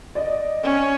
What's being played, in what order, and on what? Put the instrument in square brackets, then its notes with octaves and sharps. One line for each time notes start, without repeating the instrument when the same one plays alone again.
[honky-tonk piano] D5 D#5
[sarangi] C#4